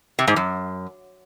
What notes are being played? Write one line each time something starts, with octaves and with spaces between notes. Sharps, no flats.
C3
G#2
F#2